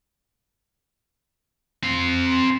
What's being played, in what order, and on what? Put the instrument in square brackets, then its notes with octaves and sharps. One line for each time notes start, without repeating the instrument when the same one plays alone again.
[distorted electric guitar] C4 F5